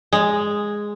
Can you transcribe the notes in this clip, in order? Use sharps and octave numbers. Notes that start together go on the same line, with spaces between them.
G#3